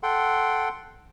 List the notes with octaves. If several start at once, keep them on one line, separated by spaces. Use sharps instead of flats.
A4 F#5 G5 C6